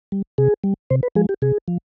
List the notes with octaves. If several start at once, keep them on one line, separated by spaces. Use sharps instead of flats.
G3
C3 G#4
G3
C3 C5
B4
F3 G#3 G#4
G4
C3 G#4
F3